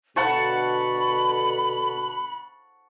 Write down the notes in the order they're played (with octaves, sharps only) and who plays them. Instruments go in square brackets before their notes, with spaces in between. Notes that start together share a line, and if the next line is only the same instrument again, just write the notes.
[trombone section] B2 D3 [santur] F#5 A5 C#6 [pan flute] B5